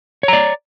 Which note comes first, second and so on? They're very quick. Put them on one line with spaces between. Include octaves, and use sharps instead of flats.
C#5 A#5 D5